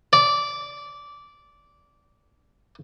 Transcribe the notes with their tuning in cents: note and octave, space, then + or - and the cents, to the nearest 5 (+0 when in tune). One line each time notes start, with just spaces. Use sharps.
D5 -15